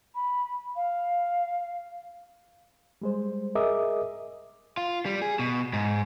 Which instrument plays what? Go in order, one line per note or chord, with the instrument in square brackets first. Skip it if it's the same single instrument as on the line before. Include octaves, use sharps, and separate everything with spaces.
[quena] B5
F5
[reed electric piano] G3 G#3 C5
G#4 A#4 D#5 E5 D6 D#6
[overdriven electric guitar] F4
G3
G#4
B2
G#2